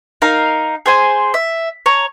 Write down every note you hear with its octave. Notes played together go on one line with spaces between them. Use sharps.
D#4 A#4 F5
G#4 C5 G#5
E5
C#5 A#5